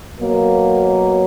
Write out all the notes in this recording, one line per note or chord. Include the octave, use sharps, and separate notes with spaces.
B2 F#3 A#3